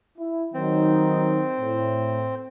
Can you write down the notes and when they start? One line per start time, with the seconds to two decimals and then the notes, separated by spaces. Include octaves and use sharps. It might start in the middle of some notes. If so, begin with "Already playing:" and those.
0.18 E4
0.54 D#3 F#3 C4 D#4
1.59 A2